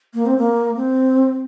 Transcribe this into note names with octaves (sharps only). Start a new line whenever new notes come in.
A#3
C4
A#3
C4